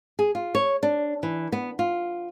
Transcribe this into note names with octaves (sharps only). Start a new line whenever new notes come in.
G#4
F4
C#5
D4
E3
B3
F4